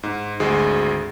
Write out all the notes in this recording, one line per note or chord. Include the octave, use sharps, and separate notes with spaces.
G#2
G#1 D2 G#3 G#4